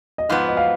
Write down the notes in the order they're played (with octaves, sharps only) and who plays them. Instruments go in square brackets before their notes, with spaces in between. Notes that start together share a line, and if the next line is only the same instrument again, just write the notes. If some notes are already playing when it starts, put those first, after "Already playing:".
[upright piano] D#5
[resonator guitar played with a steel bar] G#2 F3 B3 [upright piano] F5
[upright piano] D#5
F5